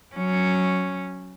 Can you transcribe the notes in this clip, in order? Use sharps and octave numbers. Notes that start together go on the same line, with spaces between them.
F#3 C#4